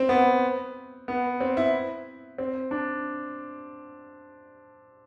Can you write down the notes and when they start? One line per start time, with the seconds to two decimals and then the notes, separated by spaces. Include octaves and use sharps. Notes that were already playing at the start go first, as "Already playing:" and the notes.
Already playing: C4
0.09 B3
1.08 B3
1.40 C4
1.57 E4
2.38 C4
2.71 D4